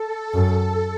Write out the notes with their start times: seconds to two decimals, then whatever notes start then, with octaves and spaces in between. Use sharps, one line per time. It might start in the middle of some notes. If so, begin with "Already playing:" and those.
Already playing: A4
0.34 F#2